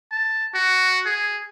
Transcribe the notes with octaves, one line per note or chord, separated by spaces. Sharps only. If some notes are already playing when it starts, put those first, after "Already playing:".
A5
F#4
G#4